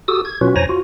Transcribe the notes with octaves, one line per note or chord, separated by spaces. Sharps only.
F#4 G4 A4 D#6 E6
G#6
B2 F#3 C#4 F4 F#4 B4
F2 C5 C#5 G#5 A#5 A#6
F4 F#4